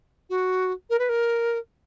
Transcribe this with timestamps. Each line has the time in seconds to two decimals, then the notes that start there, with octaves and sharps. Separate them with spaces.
0.29 F#4
0.90 A#4
0.99 B4
1.09 A#4